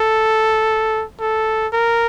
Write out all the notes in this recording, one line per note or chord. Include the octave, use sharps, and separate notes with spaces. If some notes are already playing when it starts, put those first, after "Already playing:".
Already playing: A4
A4
A#4